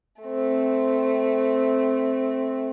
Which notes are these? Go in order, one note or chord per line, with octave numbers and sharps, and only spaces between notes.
A3 C4